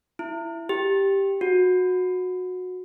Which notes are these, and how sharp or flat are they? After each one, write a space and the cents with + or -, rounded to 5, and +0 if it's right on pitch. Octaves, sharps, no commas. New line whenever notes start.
E4 +15
G4 +0
F#4 -20